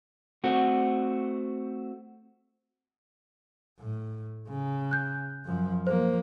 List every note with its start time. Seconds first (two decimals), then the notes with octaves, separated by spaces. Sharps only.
0.44 A3 C4 F#4
3.80 A2
4.48 C#3
4.91 F#6 G6
5.45 F#2 F3
5.87 F3 A#3 C5